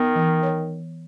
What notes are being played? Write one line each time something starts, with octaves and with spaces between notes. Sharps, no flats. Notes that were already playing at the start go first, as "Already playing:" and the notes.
Already playing: D#3 B3
E3
C#5